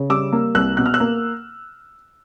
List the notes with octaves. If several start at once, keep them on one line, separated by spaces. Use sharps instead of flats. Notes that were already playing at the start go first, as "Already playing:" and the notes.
Already playing: C#3
G3 D6 E6
A#3
C2 E6 F#6
B2 F#6
F6
E6 F#6
A#3